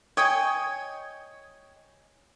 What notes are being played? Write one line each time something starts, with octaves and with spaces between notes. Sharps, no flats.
C#5 D#5 G5 G#5